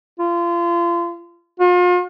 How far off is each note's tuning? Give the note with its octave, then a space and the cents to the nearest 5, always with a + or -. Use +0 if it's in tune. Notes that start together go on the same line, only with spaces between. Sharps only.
F4 -30
F4 +40